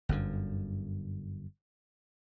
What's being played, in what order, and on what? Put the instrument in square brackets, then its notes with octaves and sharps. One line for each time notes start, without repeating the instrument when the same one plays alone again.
[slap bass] G1 F#2 D3